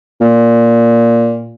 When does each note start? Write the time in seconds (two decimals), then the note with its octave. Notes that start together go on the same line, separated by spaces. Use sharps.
0.21 A#2